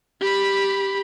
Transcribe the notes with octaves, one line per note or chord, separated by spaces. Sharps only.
G4 B5